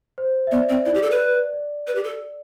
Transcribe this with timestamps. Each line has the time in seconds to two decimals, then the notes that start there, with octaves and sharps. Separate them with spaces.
0.18 C5
0.47 E5
0.51 B3 D5
0.69 C4
0.86 E4 D5
0.94 G4
1.03 A4
1.11 B4
1.53 D5
1.87 B4
1.95 G4
2.04 A4